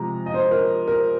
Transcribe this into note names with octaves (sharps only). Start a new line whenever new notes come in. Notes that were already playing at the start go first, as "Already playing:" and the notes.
Already playing: C3 F3 G#3 A#5
D#5
C5
A#4
A#4